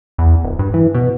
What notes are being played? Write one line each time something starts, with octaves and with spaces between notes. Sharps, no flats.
E2
D1
G2
E3
B2